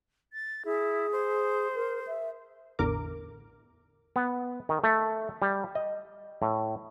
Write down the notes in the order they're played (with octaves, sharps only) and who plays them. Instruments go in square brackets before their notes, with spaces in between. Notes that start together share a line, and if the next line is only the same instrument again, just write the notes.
[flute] A6
[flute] E4 [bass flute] G#4
[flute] C5
[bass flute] A#4
E5
[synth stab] A1 E2 D3 A#4 D6
[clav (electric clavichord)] B3
D#3
A3
G3
D#5
A2